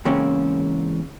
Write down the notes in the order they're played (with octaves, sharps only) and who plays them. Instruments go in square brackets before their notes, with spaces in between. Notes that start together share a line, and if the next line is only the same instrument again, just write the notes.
[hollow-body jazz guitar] E2 G#2 C#3 A#3 C4 C#4